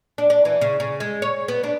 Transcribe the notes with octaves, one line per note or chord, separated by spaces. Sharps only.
D4
D4
E3
C#3
C#3
G#3
C#5
B3
D4